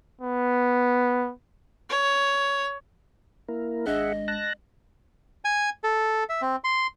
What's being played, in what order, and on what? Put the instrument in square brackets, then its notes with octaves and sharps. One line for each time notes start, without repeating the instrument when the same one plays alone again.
[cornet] B3
[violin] C#5
[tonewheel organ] A#3 E4 A#4
[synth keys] G#1 G#3 D4 [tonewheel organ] G#4 E5 F#5 [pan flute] D#5
[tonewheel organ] A5 F#6 A#6
[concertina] G#5
A4
E5
C4
C6